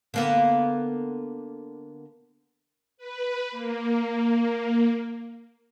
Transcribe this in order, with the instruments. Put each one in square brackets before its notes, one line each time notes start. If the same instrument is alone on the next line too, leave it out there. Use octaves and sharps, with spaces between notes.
[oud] D3 A#3 B3
[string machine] B4
A#3